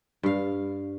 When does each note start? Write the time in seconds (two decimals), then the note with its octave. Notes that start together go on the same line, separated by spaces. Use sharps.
0.23 G2 F5